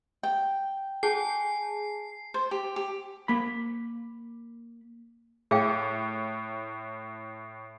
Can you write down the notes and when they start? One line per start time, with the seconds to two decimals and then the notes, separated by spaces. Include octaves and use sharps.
0.23 G5
1.03 G#4 G#5 A5 C7
2.34 C5
2.51 G4
2.76 G4
3.28 A#3 B5
5.51 A2 G#4 F5 G5